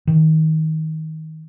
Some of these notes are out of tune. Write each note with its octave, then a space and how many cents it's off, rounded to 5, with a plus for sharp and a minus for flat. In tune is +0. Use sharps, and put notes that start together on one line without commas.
D#3 +25